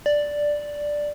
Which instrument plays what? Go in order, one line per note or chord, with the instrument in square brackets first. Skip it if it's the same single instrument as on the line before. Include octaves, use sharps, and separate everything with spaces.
[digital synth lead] D5